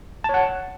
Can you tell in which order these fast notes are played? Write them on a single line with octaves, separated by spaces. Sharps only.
A5 C#5 F#5